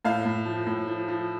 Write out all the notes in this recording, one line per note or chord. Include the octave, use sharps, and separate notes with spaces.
A2 F5
A2
F3
A2
F3
F3